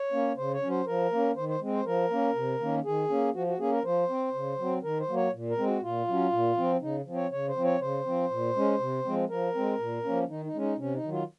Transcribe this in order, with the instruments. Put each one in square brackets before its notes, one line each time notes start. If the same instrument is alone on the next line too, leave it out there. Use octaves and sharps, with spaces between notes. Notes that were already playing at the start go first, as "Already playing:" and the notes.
Already playing: [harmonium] C#5
A#3 C#4
C#3 C5
C#5
F#3 C#4
C5
F3 A#4
A#3 C#4
D#3 C5
C5
G#3 C4
C5
F3 A#4
A#3 C#4
C3
D#3 A#3 C#4
D#3 G#4
A#3 C#4
F3 F#4
F#4
A#3 C#4 G#4
A#4
F3 C5
C4
C#3
F#3 C4
D#3 A#4
C5
F#3 A#3
C#5
A#2
A#4
G#3 C4
F#4
A#2 F4
F#3 C#4
A#2
F3 C4
C#3 D#4
F3 C4
C#5
C#3 C#5
C5
F3 C4
C#5
C#3 C5
F3 C4
A#2
G#3 C#4
C3
F3 G#3 C4
F3 A#4
G#3 C4
A#2
F3 A#3 C#4
D#3 D#4
D#4
G#3 C#4
D#4
C3 C#4
D#4
D#3 F#3
F4